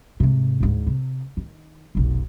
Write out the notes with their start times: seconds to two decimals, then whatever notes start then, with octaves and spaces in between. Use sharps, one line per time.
0.20 G#2 C3
0.60 D2 G#2
0.87 C3
1.37 D#3
1.95 F1 B1